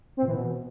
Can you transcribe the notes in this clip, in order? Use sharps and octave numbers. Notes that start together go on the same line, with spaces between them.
C4
A#2
E3
B2